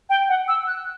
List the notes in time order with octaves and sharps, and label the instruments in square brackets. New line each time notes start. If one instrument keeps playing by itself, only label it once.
[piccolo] G5
F#5
E6
F#6